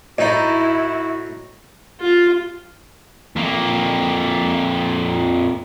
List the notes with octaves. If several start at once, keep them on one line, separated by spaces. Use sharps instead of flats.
A2 D#4 E4 F#4 D#5
F4
F2 A#3